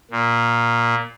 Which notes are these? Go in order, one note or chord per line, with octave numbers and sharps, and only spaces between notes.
A#2